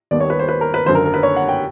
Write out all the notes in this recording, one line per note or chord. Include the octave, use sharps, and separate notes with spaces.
D#2 D#3 G3 B3 D5
C#5
B4
C5
B4
A#4
B4
G#1 F#2 D3 C5
A#4
A#4
B4
C#5
F#5
G5